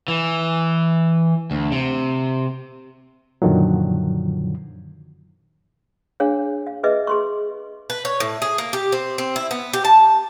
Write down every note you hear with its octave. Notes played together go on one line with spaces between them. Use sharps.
E3
D2
C3
F#2 A#2 D3 D#3 F3 F#3
D4 G#4 C#5 F5
F5
G#4 B4 D#5 E5
G#4 C6 C#6
B4
C#5
A2
G#4
A#3
G4
C4
C4
E4
B3
G4
A5